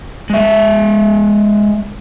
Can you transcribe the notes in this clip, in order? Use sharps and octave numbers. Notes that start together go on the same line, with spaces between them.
G#3 E5